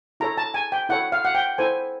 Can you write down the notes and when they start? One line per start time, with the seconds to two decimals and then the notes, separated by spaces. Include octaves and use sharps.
0.20 E4 A4 C#5 A#5
0.38 A5
0.54 G#5
0.72 G5
0.89 E4 A4 C#5 F#5
1.12 F5
1.25 F#5
1.35 G5
1.58 E4 A4 C5 G#5